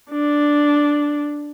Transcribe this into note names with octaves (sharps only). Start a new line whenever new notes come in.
D4